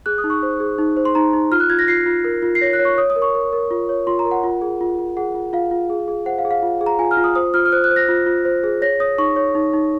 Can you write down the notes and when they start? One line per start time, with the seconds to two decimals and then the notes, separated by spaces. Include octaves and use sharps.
0.06 G#4 F#6
0.18 D#6
0.24 D#4
0.30 C#6
0.43 C5
0.60 G#4
0.78 D#4
0.97 C5
1.05 C6
1.15 D#4 A#5
1.33 D#4
1.51 F4 F6
1.60 F#6
1.70 F4 G#6
1.79 A#6
1.88 F4 C7
2.06 F4
2.24 A#4
2.42 F4
2.55 C7
2.61 C#5 A#6
2.73 F#6
2.79 C#5
2.85 C#6
2.98 C#5 D#6
3.10 D#6
3.16 A#4
3.22 C#6
3.34 A#4
3.53 A#4
3.71 F4
3.89 C#5
4.07 F4 C6
4.19 A#5
4.25 A#4
4.31 F#5
4.44 F4
4.62 G#4
4.81 F4
4.98 F4
5.17 G#4 F#5
5.34 F4
5.53 F4 F5
5.71 F4
5.90 G#4
6.08 G#4
6.26 C5 F#5
6.38 F5
6.45 G#4
6.51 F5
6.63 F4
6.81 G#4
6.86 A#5
6.99 F4 G#5
7.11 F6
7.17 F4
7.24 D#6
7.35 C5 D#6
7.54 F4 F6
7.65 F6
7.72 C5 F#6
7.84 F#6
7.91 C5
7.96 A#6
8.09 F4
8.26 F4
8.45 C5
8.64 G#4
8.82 C#5 A#6
9.00 C#5 D#6
9.18 D#4 C#6
9.36 C#5
9.55 D#4
9.73 D#4